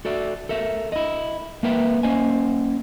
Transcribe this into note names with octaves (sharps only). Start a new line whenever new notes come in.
F#4 A4 D5 E5
A4 A#4 E5
E4 D#5
A#3 A#4 B4 E5 G5
A#3 C#4 C5 D#5 G#5